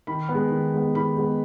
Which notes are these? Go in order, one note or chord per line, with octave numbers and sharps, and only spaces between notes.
D#3 B5
B3
G#3
D#3
G#3 B3
D#3 B5
G#3 B3